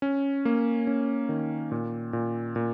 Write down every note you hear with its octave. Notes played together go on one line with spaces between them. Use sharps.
C#4
A#3
C#4
D#3
A#2
A#2
A#2